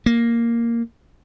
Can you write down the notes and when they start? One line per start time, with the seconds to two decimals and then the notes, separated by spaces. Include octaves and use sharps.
0.06 A#3